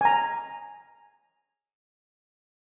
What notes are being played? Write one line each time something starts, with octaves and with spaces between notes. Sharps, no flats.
G#5 A#5